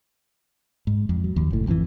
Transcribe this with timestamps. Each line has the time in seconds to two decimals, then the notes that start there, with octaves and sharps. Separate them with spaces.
0.87 G#2
1.09 F2
1.24 F#3
1.36 D#2
1.51 F#1 A2
1.67 G#1 F2 B2 E3